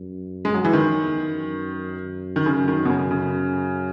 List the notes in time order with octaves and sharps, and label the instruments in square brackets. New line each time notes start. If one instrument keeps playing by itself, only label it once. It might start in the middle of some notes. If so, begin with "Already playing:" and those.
Already playing: [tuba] F#2
[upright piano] G#3
F#3
E3
[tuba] F#2 [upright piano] D#3
[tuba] E2
F#2
[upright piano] D#3
[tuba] F#2 [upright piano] C#3
[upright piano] D#3
B2
C#3
C#3